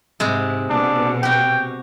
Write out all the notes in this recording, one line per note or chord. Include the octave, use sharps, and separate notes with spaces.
G#2 C3 G#3
B2 D4
F#4 G4 G5